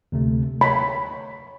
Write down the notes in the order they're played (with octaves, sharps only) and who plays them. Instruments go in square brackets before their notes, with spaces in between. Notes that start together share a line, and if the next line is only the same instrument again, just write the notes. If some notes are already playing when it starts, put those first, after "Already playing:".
[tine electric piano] D2 C3 A3
[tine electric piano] C#5 [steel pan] B5